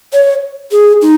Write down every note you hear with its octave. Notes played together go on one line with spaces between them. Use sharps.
C#5
G#4
D#4